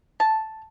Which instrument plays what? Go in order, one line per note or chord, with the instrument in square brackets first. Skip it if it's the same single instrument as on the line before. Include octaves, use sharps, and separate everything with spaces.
[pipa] A5